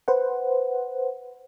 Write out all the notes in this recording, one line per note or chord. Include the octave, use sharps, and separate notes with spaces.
B4 C5 F#5